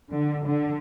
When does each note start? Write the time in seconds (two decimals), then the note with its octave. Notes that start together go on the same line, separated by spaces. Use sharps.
0.10 D3
0.45 D3